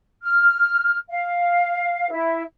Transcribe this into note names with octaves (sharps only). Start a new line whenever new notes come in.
F6
F5
E4